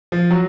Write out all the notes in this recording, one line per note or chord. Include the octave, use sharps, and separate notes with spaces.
F3
F#3